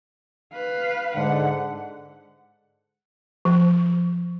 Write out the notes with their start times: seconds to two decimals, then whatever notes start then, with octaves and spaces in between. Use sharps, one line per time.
0.53 B4 F5
1.16 G#2 D3 F#5
3.45 F3